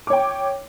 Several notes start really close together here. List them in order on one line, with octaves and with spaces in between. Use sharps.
D6 C#5 G5